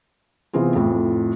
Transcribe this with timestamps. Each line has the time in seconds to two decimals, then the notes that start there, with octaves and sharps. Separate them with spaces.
0.53 C3 E3 B3 C4 F4 G#4
0.75 F2 A2